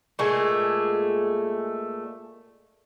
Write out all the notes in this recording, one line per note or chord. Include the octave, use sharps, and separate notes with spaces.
A#2 G#3 A3